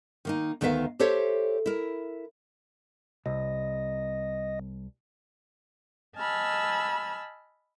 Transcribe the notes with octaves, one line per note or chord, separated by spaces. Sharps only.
D#3 A#3 D#4
D2 D#3 B3 A#4 E5 F5
G4 A4 C5 C#5 E5
E4 A#4
C2 D#5
D#5 G#5 A5 B5 E6 F6